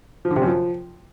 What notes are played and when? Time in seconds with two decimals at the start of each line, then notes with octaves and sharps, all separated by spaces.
0.25 F3
0.30 D3
0.36 C3
0.42 F#2
0.47 F3